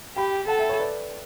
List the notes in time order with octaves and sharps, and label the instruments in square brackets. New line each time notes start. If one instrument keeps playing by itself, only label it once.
[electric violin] G4 [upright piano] G5 B5
[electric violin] A4 [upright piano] F#5 A5
[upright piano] E5 G5
C#5 E5
B4 D5